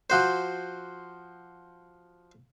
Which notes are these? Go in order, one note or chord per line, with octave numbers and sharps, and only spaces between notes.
F3 F#4 C5